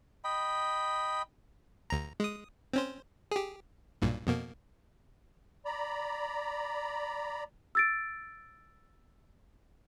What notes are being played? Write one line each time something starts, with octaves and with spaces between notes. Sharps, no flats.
D#5 G5 B5
D2 A#5
G#3 D#6
C4 C#4 C5
G4 G#4
B1 G2 A#2
F2 B2 A#3
D5 A#5 B5
E6 A6 D7